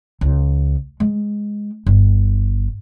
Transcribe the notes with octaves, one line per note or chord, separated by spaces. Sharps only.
C#2
G#3
G1